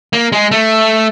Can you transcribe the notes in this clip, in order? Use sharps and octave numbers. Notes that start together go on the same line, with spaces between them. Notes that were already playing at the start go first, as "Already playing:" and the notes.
A#3
G#3
A3